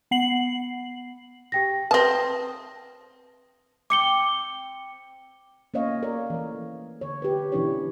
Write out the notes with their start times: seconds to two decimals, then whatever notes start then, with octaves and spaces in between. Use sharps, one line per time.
0.11 B3 F#5 C7 F#7
1.52 G4 G5 A#6
1.91 C4 B4 A5 D#6 A#6
3.90 C4 G5 D6 C#7 G7
5.74 A#3 B3 C#4 C#5 D#5 F5
6.03 A#4 C#5 D5
6.30 E3 A3
7.01 D3 C#5
7.22 G4 B4
7.52 B2 E3 C#4 D4 E4 C#5